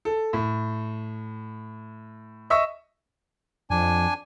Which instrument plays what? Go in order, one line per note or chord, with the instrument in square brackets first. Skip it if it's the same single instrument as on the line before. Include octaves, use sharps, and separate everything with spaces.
[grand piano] A4
A2
D#5 E5 C#6 E6
[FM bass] F2 [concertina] D4 G#5